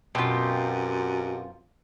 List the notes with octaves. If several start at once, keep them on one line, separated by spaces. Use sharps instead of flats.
F#2 B2 C4 F4 G4